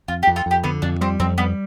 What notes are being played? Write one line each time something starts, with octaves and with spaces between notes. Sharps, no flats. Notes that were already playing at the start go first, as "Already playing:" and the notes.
F2 F4
G4
F2
F4 A4
F2 G4
D3 B3
F2 D4
G3 C4
F2 C4
G3 B3